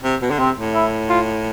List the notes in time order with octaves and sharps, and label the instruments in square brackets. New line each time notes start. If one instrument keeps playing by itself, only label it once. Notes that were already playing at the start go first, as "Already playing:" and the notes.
[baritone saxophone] C3
B2
D3
[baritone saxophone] C3 [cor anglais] C4
[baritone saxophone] A2
[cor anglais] E4
F4